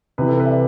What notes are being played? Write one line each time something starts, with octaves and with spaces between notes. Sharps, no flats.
C3 E3 B4
A4
B4
E5
D5